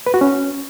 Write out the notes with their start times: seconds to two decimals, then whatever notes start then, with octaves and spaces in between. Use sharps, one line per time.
0.06 B4
0.14 F#4
0.21 C#4